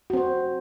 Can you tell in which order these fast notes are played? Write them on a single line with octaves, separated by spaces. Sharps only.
F#4 C4 C5